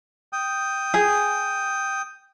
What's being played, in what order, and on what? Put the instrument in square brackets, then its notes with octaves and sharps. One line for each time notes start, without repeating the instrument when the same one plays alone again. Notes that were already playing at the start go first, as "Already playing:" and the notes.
[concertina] G5 D#6
[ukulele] G#4